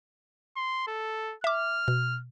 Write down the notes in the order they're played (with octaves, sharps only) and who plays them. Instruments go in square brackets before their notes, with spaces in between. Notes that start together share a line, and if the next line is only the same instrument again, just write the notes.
[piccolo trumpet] C6
A4
[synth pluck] E5 D6 [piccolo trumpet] F6
[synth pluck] B2